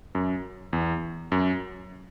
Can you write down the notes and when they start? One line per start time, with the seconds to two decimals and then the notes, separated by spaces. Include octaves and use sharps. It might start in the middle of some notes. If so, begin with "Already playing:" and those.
0.15 F#2
0.73 E2
1.32 F#2